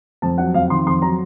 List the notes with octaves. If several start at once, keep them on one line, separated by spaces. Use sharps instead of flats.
F2 A5
F#3 F#5
F2 F5
D#3 C6
F2 C6
F#3 A#5